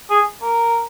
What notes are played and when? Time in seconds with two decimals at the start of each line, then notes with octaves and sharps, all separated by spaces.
0.10 G#4
0.42 A#4